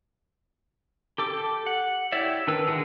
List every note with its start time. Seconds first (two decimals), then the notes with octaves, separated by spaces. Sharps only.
1.18 G4 A4 D6
1.66 F#5
2.12 E4 G4 C#5 D5 E5
2.47 D#3 D4 A#4 B4 E6
2.67 D3 D#3 G#3 F#4 G#4